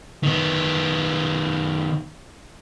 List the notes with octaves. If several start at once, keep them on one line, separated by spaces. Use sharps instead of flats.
D#3 B3